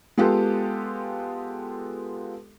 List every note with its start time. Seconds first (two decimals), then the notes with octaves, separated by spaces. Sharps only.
0.18 G#3 B3 F4 G4 A4